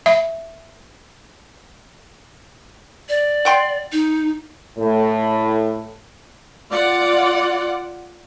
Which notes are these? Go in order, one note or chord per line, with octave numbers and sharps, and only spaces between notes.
E5
D5
F#5 G5 C6
D#4
A2
F4 D5 F#5